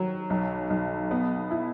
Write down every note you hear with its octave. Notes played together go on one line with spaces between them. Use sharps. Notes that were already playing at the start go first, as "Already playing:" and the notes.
Already playing: D#3 F#3
B1
B1
B3
E4